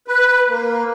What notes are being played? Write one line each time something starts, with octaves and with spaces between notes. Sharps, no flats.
B4
A#3